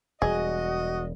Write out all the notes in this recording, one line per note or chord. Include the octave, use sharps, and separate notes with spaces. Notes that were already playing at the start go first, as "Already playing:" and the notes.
E1 G3 F#4 G#4 D#5